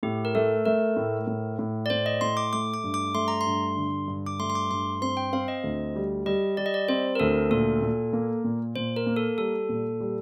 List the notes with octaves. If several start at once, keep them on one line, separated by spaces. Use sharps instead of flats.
A2 G4
A#4
A3 A4
A3 A#4
A2
A2
A2
D5
A2 C5
D#5
A2 C6
D6
A3 D6
D6
G2
D6
A3 C6
A#5
C6
G2
D3
G2
D6
A3 C6
C6
D6
G2 C6
C4 C6
G5
C4 F5
D#5
D2
G3
G3 D#5
G3 D5
D#5
D5
C4 C5
A#4
D2 A4
A#2 A4
A#2
A#3
A#2
A#2 C5
A#4
A#3
A4
G3 A4
A#2
G3